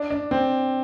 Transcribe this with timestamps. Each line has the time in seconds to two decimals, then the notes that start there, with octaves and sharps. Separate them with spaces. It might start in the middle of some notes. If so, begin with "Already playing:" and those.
Already playing: D4
0.10 D4
0.31 C4